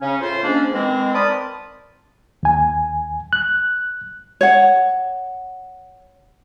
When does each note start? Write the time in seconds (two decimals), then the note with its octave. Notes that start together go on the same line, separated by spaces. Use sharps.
0.01 C#3 C#4
0.21 A2 F4 C5
0.43 F3 G#3 A#3 C#4 D4
0.73 D#3 E3 G#3 C4
1.14 A#4 C5 D5 A5 B5 D#6
2.43 D#2 G#5
3.33 F#6
4.41 C#5 F#5